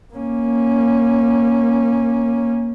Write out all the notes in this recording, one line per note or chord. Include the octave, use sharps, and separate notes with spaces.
A#3 C#4